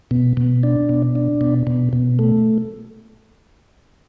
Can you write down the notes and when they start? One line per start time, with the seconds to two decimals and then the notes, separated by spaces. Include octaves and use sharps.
0.11 B2
0.37 B2
0.63 D4
0.89 B2
1.15 D4
1.41 B2
1.67 B2
1.93 B2
2.19 A3